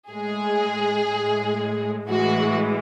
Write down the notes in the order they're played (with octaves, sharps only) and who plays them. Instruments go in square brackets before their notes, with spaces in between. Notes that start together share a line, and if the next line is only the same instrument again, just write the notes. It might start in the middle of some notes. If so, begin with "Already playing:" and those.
[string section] A2 G#3 G#4
A2 G#3
A2 E3 G#3 F#4